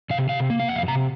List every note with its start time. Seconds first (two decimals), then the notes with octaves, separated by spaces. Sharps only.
0.10 C3 F5
0.29 C3 F5
0.50 A#3
0.60 F5
0.68 F2 F#5
0.76 F5
0.88 C3 A#5